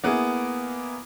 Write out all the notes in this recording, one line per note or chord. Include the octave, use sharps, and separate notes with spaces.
A#3 B3 E4 G#4